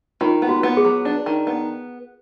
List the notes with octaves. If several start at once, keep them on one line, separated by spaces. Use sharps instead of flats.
D#3 F4
B3
F#4
B3
G#4
F#3
D4
D#3
B3